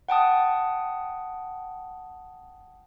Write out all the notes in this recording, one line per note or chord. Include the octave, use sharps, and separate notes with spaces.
F#5 G5 A5 D#6